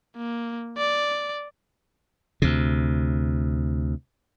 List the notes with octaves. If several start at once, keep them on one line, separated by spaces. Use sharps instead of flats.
A#3
D5
D2 C3